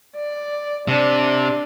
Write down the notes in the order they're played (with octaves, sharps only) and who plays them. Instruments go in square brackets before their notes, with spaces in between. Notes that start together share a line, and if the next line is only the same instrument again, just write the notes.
[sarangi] D5
[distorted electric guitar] C3 [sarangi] D4